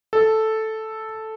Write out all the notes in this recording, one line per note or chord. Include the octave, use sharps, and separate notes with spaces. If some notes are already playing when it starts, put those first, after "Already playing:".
A4